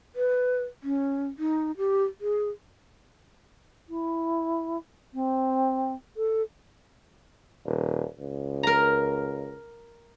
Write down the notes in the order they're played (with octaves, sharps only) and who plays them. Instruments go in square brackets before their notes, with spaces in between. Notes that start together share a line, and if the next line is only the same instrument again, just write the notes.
[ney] B4
C#4
D#4
G4
G#4
[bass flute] E4
C4
A4
[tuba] D#1
C#2
[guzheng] A#4 A#5